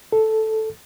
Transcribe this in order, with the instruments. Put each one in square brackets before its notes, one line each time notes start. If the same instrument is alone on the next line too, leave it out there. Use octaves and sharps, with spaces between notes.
[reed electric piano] A4